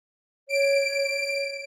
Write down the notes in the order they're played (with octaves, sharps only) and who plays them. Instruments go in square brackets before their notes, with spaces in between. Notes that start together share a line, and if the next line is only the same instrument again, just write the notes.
[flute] C#5 [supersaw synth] D7